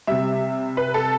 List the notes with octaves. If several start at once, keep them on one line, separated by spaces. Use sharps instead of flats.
C3 G3 E5
B4
A4